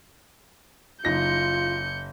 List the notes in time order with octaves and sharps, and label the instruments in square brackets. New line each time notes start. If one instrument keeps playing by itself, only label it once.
[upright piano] F#1 D#4 A#6 [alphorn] F4 [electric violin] G6 C#7